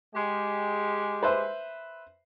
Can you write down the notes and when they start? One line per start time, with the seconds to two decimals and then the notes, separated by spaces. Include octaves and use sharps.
0.15 G#3 G4
1.23 B4 C5 E5